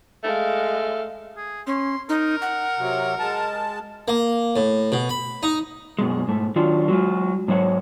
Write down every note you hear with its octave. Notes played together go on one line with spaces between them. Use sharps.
G#3 A3 F5
G#4
C#4 C6
D#4 A#4
F#5
C3 F#3
G#3 A5
A#3
A2
B2
B5
D#4
F#2 B2 G#3
G#2 A3
D#3 F#3 D4 F4
F#3 G#3 F4
G#2 F#3 C5 C#5 F#5